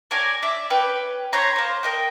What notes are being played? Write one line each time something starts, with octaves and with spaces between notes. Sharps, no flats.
A#4 C#5 D5 G#5
D5 E5
C#4 B4 G5
C5 C#5 A#5 B5
A#3 C5
A#4 D#5 G5